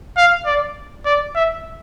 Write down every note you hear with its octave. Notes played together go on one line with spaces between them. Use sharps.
F5
D5
D5
E5